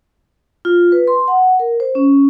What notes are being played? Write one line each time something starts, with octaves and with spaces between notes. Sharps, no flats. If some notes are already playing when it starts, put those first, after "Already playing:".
F4
B4
C6
F#5
A#4
C5
C#4